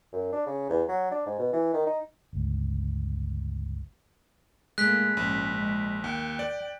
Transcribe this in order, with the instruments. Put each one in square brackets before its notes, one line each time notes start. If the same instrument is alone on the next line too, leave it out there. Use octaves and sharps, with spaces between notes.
[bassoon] F#2
D4
C#3
E2
F#3
D4
G#2
B2
E3
D#3
D#4
[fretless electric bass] G1 C#2
[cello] A2 A#3 [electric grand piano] G#3 [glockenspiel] F#6 B6
[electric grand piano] A#1 [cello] G#2 C#4
[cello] G#3
[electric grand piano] D#2 [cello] G5
[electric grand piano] D5